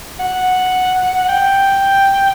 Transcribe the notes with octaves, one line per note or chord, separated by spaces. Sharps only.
F#5
G5